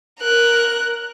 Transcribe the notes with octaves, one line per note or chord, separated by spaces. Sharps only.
A#4 F#6